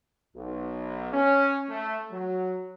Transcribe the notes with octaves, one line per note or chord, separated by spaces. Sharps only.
B1
C#4
A3
F#3